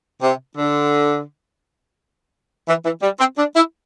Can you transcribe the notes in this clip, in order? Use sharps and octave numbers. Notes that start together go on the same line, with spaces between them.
C3
D3
E3
E3
G3
C4
D4
E4